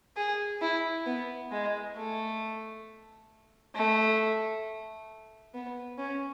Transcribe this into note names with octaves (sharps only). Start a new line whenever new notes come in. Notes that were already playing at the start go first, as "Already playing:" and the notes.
G#4
E4
B3
G#3
A3
A3
B3
C#4